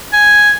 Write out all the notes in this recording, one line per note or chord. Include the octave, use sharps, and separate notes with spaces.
G#5